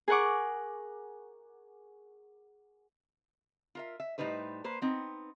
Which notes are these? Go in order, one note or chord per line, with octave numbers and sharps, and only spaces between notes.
G#4 A#4 F#5 C#6 D6
F4 A#4 E5
E5
A2 E3 G3 D#4 B4 C5
A#3 B4 C5
B3 C4 D#4